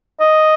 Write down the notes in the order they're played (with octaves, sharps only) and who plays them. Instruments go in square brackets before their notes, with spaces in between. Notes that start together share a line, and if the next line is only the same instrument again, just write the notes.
[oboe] D#5